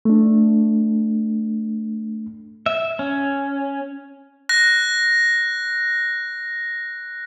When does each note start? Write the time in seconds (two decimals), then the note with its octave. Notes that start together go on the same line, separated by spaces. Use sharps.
0.05 A3 D4
2.66 E5
2.99 C#4
4.49 F#6 A#6